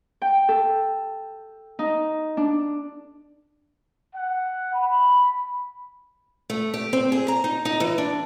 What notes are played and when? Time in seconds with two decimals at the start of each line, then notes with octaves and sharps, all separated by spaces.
0.22 G5
0.49 A4
1.79 D#4
2.37 D4
4.15 F#5
4.73 B5
6.50 A3
6.74 G4
6.93 C4
7.12 G#4
7.28 A#5
7.44 D#4
7.65 D#4
7.80 E3
7.98 D4